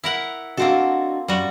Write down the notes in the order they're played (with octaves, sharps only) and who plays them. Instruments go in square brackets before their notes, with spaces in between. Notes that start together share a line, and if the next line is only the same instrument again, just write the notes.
[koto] E4 A#4 F#5
[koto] A#3 C4 A4 [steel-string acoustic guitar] D4 F#4 D#5
[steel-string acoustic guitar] F#2 [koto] G3 F#4